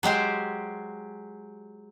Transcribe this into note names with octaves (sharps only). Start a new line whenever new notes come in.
F#3 G#3 G4 C5